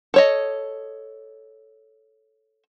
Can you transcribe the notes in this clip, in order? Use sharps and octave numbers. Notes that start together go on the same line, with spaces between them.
A4 C#5 D#5